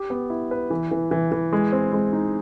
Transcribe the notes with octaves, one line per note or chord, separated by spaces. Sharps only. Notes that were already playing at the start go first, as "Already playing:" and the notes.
Already playing: G4
B3
E4
B4
E3
E3
E3
E3
G#3
C4
G#3
D#4